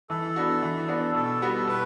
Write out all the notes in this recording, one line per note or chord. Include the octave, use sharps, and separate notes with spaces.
E3 A4
B3 D4 F#4
E3
B3 D4 F#4
B2 A4
G3 B3 F#4
B2 B4